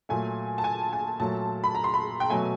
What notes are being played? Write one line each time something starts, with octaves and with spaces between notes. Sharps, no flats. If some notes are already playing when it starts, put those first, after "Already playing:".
A#2 F#3 A3 G#5
A5
G#5
G#5
A#2 F#3 A3 A5
B5
A#5
C6
B5
G5
B2 F#3 A3 G#5